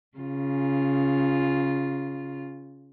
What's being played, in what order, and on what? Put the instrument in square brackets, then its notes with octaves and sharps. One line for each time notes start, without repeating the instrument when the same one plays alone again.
[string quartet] C#3 F4